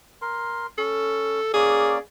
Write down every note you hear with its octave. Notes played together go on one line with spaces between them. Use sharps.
A#4 C6
C#4 A4
A#3 C#4 G#4 D5